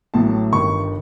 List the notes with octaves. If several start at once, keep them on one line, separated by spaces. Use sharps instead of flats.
A1 A2 F#3 A5
G1 G2 D#3 C#6